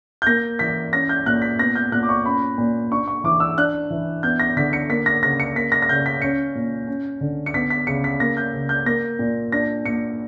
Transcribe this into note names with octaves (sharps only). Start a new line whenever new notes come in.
G6
A#3 A#6
E3 B6
C#4 A#6
G6
A#2 F#6
B6
B3 A#6
G6
A#2 F#6
D6
C#6
C#4 B5
A#2
D4 C#6
C#6
E3 D6
E6
D4 F#6
E3
B3 G6
A#6
D3 B6
C#7
A#3 B6
A#6
C#3 A#6
C#7
A#3 B6
A#6
A#6
C#3 G6
B6
C#4 C#7
A#2
C#4
D3
C#7
B3 B6
B6
C#3 C#7
B6
A#3 A#6
G6
C#3
G6
A#3 A#6
A#2
D4 A#6
A#2 C#7